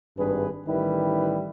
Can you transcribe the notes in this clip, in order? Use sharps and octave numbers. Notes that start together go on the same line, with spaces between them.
G#1 G2 G#4 B4
A1 D#3 G3 E4 B4